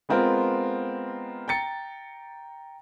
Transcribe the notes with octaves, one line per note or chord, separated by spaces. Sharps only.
G#3 B3 C4 F4 A#4
G5 A#5 A6 C#7